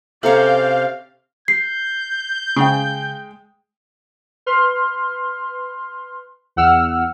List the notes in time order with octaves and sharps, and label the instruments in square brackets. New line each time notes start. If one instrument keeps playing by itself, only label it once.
[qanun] C3 C#4 [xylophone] A4 A#5 C#7 [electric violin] D5 G6 [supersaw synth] F5
[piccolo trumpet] G6 [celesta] C7
[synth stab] C#3 [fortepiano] G#3 G5
[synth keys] B4 C6 F6
E2 F#5 E6 F6